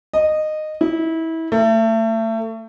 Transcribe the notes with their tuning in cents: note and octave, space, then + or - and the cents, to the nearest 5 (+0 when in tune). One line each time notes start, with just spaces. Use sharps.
D#5 -15
E4 -25
A3 +30